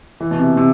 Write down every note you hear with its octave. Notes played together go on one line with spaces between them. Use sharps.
E3
B2
C3
C3